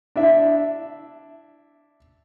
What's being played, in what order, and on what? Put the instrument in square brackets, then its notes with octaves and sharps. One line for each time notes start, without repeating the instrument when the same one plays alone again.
[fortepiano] D4 E4 E5